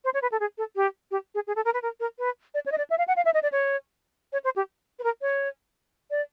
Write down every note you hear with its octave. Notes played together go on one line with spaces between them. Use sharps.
C5
C#5
B4
A4
G#4
A4
G4
G4
G#4
G#4
A4
A#4
B4
A#4
A#4
B4
D5
C#5
D#5
D5
E5
F5
F#5
F5
E5
D#5
D5
C#5
C#5
C5
G4
B4
A#4
C#5
D5